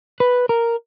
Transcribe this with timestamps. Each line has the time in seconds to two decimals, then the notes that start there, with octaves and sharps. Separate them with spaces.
0.20 B4
0.49 A#4